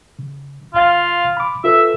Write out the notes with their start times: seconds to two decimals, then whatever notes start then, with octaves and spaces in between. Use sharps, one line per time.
0.19 C#3
0.74 G#1 F4 F5 A6
1.37 B5 D6
1.64 F4 A4 B4 E5